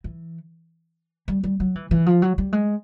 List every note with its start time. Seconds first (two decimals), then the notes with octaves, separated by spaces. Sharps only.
0.04 E3
1.28 G3
1.44 G3
1.60 F#3
1.75 E3
1.91 E3
2.06 F3
2.22 F#3
2.38 G3
2.53 G#3